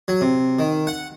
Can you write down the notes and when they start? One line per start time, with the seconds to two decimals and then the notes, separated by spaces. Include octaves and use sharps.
0.08 F#3
0.21 C3
0.59 D#3
0.87 F#5